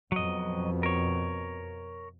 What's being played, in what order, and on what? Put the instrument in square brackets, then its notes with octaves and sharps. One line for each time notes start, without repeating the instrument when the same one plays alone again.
[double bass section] F2 B2 [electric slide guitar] F#3 D#5
[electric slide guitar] A#4 C#5